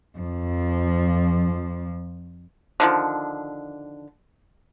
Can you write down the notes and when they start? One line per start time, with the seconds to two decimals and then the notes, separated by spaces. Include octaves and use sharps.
0.18 F2 F3
2.80 D3 D#3 F3